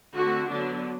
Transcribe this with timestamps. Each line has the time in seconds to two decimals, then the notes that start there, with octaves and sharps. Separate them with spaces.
0.15 D3 A3 C4 F#4
0.50 D3 F#3 B3 D4